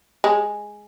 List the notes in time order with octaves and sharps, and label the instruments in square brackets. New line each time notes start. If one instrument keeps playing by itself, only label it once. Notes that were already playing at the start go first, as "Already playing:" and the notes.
[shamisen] G#3